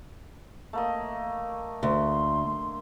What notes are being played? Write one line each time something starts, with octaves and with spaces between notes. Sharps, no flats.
A3 A#3 D#5
D2 C6